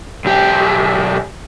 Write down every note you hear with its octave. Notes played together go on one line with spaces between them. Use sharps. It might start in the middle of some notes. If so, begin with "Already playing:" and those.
B1 G4